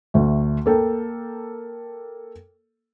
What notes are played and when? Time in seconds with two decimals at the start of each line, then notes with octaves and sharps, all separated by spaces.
0.14 D2 A3
0.66 A#3 A4 G5